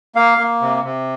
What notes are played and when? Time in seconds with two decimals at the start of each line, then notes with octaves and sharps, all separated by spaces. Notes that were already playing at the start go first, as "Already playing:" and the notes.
0.15 A#3 F5
0.38 A#3
0.61 C3
0.84 C3